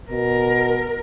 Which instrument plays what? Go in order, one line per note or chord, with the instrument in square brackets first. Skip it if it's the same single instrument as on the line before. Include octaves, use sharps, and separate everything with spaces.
[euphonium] B2 [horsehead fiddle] A#4